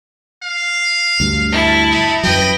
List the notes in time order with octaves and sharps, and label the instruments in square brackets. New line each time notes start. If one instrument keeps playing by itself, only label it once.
[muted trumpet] F5
[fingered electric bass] D2 G2
[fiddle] E4 A5
[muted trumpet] D#4
[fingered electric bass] F#2 F#3 [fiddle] B4 G5 [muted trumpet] D#5